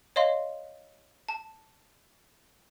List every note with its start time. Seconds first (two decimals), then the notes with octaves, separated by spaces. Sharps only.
0.16 C#5 D#5 F5 C6
1.29 A5